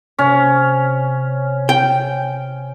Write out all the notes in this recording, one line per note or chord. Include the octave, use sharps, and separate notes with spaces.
C3 C#4
G5